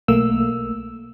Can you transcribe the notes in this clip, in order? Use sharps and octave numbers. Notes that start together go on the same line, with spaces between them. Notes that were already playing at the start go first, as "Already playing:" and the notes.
B1 A3 A#3 E6